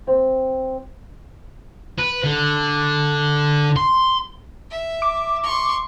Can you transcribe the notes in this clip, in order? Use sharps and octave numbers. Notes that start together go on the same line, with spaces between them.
C4
B4
D3
C6
E5
D6
C6 C#6